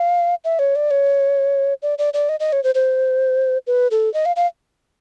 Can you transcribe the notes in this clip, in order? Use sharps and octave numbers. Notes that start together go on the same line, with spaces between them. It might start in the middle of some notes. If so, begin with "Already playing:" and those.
Already playing: F5
E5
C#5
D5
C#5
D5
D5
D5
D#5
D#5
C#5
C5
C5
B4
A4
D#5
F5
F5